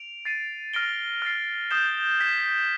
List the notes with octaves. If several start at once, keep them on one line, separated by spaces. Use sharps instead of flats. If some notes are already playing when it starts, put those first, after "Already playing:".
Already playing: D7 F7
A6 C7 D#7
F6 A#6 D7 G7
F6 A6 C7
D#6 G6 C7 E7 G7
G#6 B6 E7